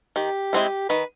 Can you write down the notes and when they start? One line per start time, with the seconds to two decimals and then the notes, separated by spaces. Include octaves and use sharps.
0.16 D#3 G4
0.53 G#3 C4 E4
0.89 D#3 B4